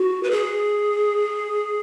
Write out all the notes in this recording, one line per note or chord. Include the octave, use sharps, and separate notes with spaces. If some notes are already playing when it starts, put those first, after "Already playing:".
Already playing: F#4
B4
G#4